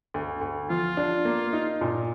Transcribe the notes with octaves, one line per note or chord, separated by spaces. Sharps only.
D2
D2
F3 F4
D4
A#3
D#4
A#2